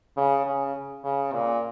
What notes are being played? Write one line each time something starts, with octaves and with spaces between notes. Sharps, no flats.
C#3
C#3
C#3
A#2